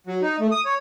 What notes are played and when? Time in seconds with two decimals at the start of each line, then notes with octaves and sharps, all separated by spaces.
0.07 F#3
0.22 D#4
0.40 A3
0.51 D#6
0.65 C#5